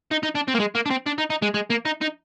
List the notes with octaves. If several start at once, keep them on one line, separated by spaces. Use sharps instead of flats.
D#4
D#4
D4
C4
A#3
G#3
A#3
D4
C4
D4
D#4
D#4
G#3
G#3
A#3
D#4
D#4